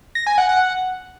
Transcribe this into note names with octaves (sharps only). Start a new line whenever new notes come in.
A#6
G#5
F#5
F#5